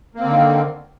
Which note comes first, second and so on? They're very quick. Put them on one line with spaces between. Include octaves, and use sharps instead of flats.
A#3 C4 D3 D#3